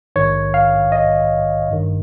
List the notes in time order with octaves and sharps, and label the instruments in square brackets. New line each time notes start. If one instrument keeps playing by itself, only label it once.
[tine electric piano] A#1 G#2 D#3 C#5
F5
D#5
G#1 G2 D#3